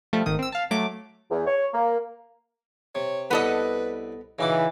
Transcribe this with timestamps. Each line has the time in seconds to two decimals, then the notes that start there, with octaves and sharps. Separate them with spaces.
0.13 F3 G3 A3
0.26 G#1 D#3 D#6
0.39 C4 E6
0.52 F5 A5
0.71 F#3 A3 D6
1.31 E2
1.47 C#5
1.74 A#3
2.95 C3 C#5
3.31 C2 B3 A4 B4 D5 D#5
4.39 C#3 E3 D#4 F#4 D6